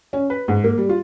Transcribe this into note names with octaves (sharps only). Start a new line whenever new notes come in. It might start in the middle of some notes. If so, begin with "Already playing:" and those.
C#4
B4
G#2
A#3
G3
F4